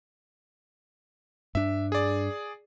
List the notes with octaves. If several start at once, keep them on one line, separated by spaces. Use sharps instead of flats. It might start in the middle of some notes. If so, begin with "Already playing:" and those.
G2 D4 E5
G#4 D5